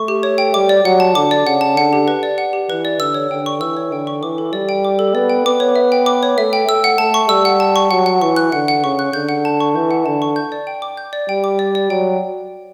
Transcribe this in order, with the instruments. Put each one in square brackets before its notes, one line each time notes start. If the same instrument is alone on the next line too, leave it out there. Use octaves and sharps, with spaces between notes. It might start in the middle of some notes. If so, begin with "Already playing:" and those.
Already playing: [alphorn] A3 [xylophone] C#6
[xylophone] G4
C#5
G5
[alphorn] G3 [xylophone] D6
[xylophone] D5
[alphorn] F#3 [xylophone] F#5
[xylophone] A5
[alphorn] D3 [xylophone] D6
[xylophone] D5
[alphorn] C#3 [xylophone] F#5
[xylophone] A5
[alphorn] D3 [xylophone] F#5
[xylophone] G4
B4
D5
F#5
G4
[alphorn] E3 [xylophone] B4
[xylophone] D5
[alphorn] D3 [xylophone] E6
[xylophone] C#5
[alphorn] D3 [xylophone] G5
[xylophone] C#6
[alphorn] E3 [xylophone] E6
[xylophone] C#5
[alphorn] D3 [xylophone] G5
[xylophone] C#6
[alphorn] E3 [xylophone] D6
[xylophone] A4
[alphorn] G3 [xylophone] D5
[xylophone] G5
D6
A4
[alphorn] B3 [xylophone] D5
[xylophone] G5
[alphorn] B3 [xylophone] D6
[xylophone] C#5
E5
G5
D6
C#5
[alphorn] A3 [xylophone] E5
[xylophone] G5
[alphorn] A3 [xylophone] E6
[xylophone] F#5
[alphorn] A3 [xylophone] A5
[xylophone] C#6
[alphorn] G3 [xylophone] E6
[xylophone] F#5
A5
C#6
[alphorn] F#3 [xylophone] F#5
[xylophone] F#5
[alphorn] E3 [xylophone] C#6
[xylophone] F#6
[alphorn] D3 [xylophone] F#5
[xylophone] F#5
[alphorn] C#3 [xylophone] C#6
[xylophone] F#6
[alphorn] D3 [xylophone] G6
[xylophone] F#5
A5
C#6
[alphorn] E3 [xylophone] G6
[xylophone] F#5
[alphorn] D3 [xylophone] A5
[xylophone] C#6
G6
D5
G5
D6
G6
D5
[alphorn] G3 [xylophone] G5
[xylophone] D6
D5
D5
[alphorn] F#3 [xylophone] G5